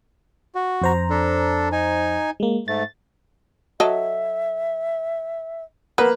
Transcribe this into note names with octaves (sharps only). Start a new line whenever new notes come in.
F#4
F2 C5 A#5
D4 A4
D#4 G#5
G#3 A#3
G#2 A3 A6
F#3 A4 D#5 E5
A#3 B3 B4